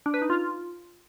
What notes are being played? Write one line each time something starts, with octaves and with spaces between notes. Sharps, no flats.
D4
B4
D#4
F4